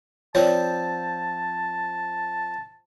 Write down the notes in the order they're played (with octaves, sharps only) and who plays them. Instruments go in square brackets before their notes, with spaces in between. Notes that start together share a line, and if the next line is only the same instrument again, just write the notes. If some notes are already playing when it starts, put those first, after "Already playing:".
[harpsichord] F3 C4 [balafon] C#5 D5 [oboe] A5